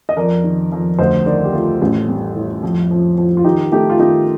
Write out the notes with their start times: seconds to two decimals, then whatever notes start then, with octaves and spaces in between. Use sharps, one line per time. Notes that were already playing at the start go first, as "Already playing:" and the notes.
0.09 D#5
0.17 F2 A#4 D5
0.44 D#3
0.72 F2
0.99 D2 C5 D#5
1.26 D#3 A#4 D5
1.44 G4
1.53 A3 F4 A4
1.82 A1
2.08 G3
2.35 A2
2.63 F2
2.91 F3
3.18 F3
3.37 F4
3.44 D#3 D#4 G4
3.72 A3 D#4 G4
3.90 F4
3.99 D#3 D#4 G4